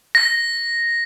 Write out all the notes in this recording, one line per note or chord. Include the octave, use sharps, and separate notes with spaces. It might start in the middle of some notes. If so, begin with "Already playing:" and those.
A#6